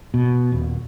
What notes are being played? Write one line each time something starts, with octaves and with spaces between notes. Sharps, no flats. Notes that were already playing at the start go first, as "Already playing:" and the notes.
B2
D#1